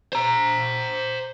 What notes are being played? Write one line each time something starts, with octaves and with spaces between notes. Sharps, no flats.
C5 A#5